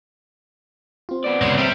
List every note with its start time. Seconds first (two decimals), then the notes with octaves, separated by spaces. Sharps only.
1.09 C4 F4
1.24 B3 D5
1.42 C#3 G#3 C#5
1.58 G3 C4 G4 E5